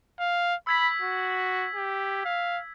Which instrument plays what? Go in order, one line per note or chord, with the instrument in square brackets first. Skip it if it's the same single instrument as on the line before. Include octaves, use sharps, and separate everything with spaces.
[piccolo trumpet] F5
[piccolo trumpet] B5 [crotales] E6 G#6 B6
[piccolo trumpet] F#4
G4
F5